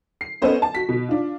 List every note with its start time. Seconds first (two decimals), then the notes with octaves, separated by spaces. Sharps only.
0.21 C7
0.42 B3 C#4 A4 B4 C5 D#5
0.62 A5
0.75 F#4 B6
0.89 B2
1.08 D4 F4